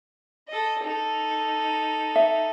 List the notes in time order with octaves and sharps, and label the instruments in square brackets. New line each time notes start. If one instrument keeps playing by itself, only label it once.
[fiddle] A4 D#5
D#4 A4
[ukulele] E5